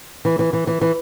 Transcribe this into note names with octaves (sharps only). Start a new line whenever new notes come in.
E3
E3
E3
E3
E3